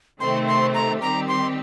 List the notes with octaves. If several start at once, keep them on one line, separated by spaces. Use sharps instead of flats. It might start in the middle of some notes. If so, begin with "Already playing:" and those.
C3 D#3 A3 C4 C6
C6
A#5
D#3 G3 C4 G4 A#5
C6